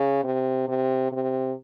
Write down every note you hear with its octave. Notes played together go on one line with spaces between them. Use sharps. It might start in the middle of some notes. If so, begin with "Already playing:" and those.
Already playing: C#3
C3
C3
C3